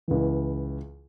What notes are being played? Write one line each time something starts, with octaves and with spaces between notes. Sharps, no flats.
C#2 E3